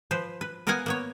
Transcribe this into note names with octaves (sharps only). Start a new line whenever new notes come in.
F3 B4 C5
B4
B3 A#4 D#5 F5 F#5 G#5
A#3 B3 C#5